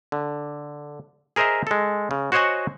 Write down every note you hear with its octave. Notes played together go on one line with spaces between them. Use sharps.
D3
G#4 A#4 C5 D#5 E5 A#5
G#3 A4
C#3
F#4 C5 C#5 D#5 F#5 G#5